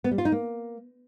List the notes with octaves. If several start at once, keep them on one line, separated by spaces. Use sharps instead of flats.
B3
G3
F4
D#4
A#3